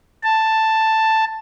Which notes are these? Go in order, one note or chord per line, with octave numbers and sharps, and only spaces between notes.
A5